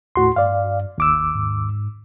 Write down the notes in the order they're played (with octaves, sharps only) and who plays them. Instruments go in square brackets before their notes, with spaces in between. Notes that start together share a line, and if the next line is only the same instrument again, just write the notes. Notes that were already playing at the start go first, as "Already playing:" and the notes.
[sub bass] D#2 [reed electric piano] A2 F#4 C6
[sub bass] G2 [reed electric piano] D5 F5
[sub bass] G1 [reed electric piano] D#2 D6 E6
[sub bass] G#2